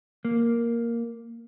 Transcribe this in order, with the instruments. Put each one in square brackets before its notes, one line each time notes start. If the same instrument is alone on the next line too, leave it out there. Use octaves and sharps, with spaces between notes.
[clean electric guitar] A#3